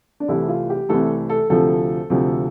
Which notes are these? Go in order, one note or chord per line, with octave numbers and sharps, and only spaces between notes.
D4
C2 C3 E3 A3 E4
F4
G4
C2 C3 E3 A3 A4
A4
D2 C3 F3 A4
D2 C3 F3